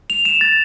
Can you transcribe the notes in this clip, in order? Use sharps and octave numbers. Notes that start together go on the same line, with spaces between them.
F7
E7
A6